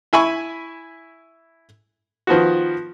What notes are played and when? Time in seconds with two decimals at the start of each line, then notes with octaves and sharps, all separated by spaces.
0.13 E4 E5 G#5 B5 C#6
2.27 D#3 F3 B3 F#4